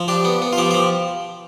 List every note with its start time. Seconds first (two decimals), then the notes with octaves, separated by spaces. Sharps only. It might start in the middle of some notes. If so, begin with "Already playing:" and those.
Already playing: F3
0.08 D4 G4
0.25 B3
0.42 B3
0.53 F4
0.58 F3 G4
0.71 F3 G4